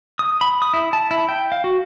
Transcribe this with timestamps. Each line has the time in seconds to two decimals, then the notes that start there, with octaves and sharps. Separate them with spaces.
0.19 D#6
0.41 B5
0.62 D#6
0.74 E4
0.93 A5
1.11 E4
1.29 G5
1.52 F5
1.64 F#4